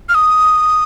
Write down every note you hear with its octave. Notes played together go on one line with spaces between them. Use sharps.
F6
D#6